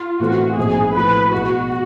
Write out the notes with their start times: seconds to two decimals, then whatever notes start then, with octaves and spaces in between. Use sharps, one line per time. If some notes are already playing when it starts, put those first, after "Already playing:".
Already playing: F4
0.19 A2 E3 A3 C4 F#4
0.57 A#1 G#2 F3 G#3 C4 G#4
0.94 A2 F3 A3 B4
1.32 B1 B2 G#3 B3 F#4